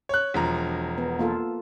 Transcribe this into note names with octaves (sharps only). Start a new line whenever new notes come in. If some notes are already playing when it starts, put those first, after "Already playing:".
C#5 F#6
E1 F3 A#5
B3
A#3 F4 A4